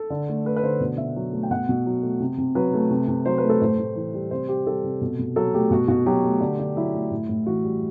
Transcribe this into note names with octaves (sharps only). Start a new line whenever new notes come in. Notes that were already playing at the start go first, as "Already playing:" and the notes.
Already playing: A4
D3
A3
A3 B4
B4
D3 C5
B2
B2 E5
F#3
A3
G5
B2 F#5
B2
F#3
A3
C3
C3
F#3 B4
A3
C3
C3
F#3 C5
B4
A3
A4
A2 C5
A2
E3
G3
C3 C5
G3 G4
G3 A4
C3
B2
B2
F#3 A4
A3 G4
B2 F#4
B2 F#4
F#3 G4
A3
D3
D3
F#3 E4
A3
A2
A2
E3 F#4
G3